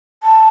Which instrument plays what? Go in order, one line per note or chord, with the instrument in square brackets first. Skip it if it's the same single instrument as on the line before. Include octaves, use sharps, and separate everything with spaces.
[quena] A5